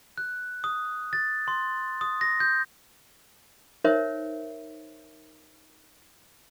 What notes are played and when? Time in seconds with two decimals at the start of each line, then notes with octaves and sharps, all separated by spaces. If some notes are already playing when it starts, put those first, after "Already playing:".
0.18 F#6
0.64 D#6
1.13 A6
1.48 C6
2.01 D#6
2.21 A#6
2.40 G6
3.84 D#4 A#4 C5 C#5 E5